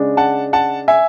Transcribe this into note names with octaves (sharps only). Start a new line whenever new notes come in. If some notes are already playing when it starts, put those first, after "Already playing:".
Already playing: C#3 G#3 D4
F#5 A5
F#5 A5
E5 G#5